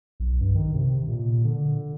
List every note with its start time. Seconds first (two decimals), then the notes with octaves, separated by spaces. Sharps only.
0.20 B1
0.41 G2
0.55 D#3
0.74 C3
1.08 A#2
1.45 D3